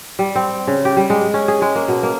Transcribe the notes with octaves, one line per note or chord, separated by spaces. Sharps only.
G3
C4
C#3
G4
G3
G#3
C#4
G#4
G#3
A#3
B2
A#3